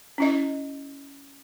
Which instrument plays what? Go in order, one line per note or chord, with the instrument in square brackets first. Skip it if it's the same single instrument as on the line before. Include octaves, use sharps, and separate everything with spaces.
[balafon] C#4 E4 D#5